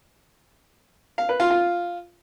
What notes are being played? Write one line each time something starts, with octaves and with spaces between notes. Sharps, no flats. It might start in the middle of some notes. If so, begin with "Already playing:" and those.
F5
B4
F4
F4